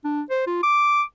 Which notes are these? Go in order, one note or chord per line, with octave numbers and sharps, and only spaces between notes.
D4
C5
F4
D6